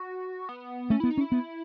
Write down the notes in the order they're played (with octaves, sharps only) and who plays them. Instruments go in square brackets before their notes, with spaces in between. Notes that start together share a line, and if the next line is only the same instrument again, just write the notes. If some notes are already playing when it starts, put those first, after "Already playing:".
Already playing: [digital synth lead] F#4
B3
[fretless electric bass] A3 [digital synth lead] C#4
[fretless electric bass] B3 [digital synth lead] E4
[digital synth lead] D#4
[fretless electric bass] C#4
[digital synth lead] E4
[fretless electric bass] B3